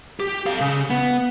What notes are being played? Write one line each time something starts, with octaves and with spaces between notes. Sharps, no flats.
G4
A4 F5
C#3
B3